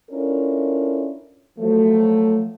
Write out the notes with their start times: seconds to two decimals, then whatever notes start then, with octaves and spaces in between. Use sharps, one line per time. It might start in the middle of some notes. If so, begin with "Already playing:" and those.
0.11 C#4 D4 E4 F4 A4 A#4
1.59 F3 F#3 A3